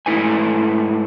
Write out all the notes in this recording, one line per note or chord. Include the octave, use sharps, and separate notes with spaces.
G#2 A3 E4 B4 G#5